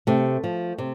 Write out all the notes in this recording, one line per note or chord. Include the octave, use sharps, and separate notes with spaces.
C3 A3
F3
C3